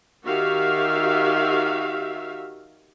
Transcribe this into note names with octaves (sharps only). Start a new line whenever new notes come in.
D#3 F#4 G4 E5 F5